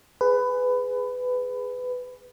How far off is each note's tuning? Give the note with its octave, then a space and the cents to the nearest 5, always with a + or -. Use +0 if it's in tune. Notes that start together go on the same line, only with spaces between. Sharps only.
G#4 +0 B4 +20